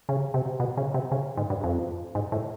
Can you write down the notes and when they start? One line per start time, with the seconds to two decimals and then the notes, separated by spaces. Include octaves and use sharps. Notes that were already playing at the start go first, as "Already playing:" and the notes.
0.09 C#3
0.34 C3
0.60 B2
0.77 C#3
0.94 C3
1.12 C#3
1.37 G#2
1.50 G2
1.63 F2
2.15 G#2
2.32 A2